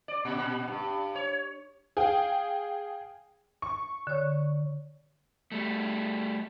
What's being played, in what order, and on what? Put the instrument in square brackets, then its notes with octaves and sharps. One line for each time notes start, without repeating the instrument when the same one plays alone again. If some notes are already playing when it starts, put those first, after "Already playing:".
[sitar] D5
A#2
A#2
G2
C#5
[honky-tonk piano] G#4 F5 G5
C#6
[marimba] D3 C#5
[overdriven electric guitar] G3 A3